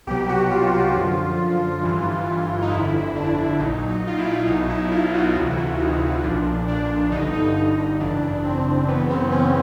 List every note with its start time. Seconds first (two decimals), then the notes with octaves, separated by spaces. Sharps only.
0.07 C2 B2 F#3 G4
0.29 F#4
0.43 F#4
0.51 F4
0.73 F4
0.95 F#2 D3 F3
1.83 G1 G2 E3
2.62 D#4
2.72 G1 F2 D3 E4
3.16 D4
3.60 A#1 A#2 F#3 D#4
3.89 D#4
4.07 F4
4.19 E4
4.47 B1 B2 F#3 D#4
4.70 E4
4.92 F4
5.14 F#4
5.36 D2 C3 E3 F#4
5.50 E4
5.58 F4
5.80 D#4
6.02 D#4
6.24 B1 A#2 F3 D4
6.68 D4
7.11 G1 G2 D3 D#4
7.34 D#4
7.56 D#4
7.79 D#4
8.00 G#1 F#2 C#3 E3 D4
8.44 C4
8.88 F#2 C#3 E3 B3
9.10 C4
9.32 C#4